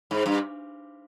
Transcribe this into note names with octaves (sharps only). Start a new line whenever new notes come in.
G#2
G2